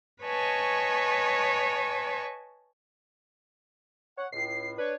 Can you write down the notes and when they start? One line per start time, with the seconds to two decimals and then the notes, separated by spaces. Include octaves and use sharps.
0.23 B4 C#5 D#5 G#5 A5 C#6
4.17 C#5 F#5
4.32 C#2 A2 C7
4.78 D4 B4 C#5